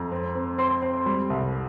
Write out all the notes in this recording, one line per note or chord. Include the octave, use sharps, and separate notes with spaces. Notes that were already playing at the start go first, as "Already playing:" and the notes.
Already playing: F2 A#5
C4
C4
C4 C6
C4
G3
C2